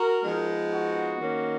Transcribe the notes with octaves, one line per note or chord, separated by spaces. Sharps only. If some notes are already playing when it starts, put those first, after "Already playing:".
Already playing: F#4 A#4
F3 G#3 B3 D#4
F#4
D#3 A#3 C#4